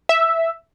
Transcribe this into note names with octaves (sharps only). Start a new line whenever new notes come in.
E5